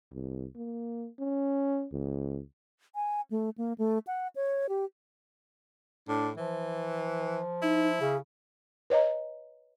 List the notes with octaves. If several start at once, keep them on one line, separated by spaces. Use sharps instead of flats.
C2
A#3
C#4
C#2
G#5
A3
A#3
A3
F#5
C#5
G4
A2 D4
E3 F3
D#4 E4
C#3 G#4
B4 C#5 D#5 A#5